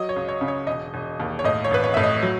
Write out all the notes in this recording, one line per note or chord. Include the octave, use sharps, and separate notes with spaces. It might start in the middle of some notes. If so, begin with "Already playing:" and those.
Already playing: F#3 D#5
C#5
C#2
C#5
C#3
C#5
E1 D#5
E1
D#2
C#5
A2 D#5
C#5
A1 B4
C#5
A2 E5
D#5
F#3